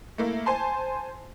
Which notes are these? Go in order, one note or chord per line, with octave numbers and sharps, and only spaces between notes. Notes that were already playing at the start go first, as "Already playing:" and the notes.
A3 A#3 E4
C5 G#5 A5 C6